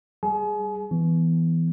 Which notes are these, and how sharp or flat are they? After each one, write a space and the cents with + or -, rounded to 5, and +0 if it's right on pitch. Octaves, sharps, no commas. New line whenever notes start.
G3 +0 G#4 +0 G#5 +40
E3 +0 B3 +0